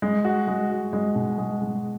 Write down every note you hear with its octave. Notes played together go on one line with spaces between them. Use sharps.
G#3
F#4
G#3
F#4
G#3
B2
G#3
G#3